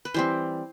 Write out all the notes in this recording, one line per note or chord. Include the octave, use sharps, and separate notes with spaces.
B4
E3 G3 C4 C5